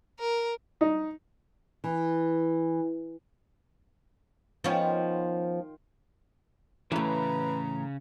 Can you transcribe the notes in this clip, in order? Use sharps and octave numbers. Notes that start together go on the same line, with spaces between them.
A#4
D#4
E3
D#3 F3 B3 C#4 F4 G5
A2 C#3 E3 C#4 B4 A#5